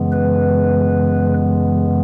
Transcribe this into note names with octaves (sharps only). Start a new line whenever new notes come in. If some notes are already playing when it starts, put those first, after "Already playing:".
Already playing: F#2 C#3 E3 G#3 B3
B4